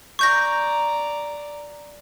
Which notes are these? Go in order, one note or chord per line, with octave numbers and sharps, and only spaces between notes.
D5 A#5 C#6 G6 A#6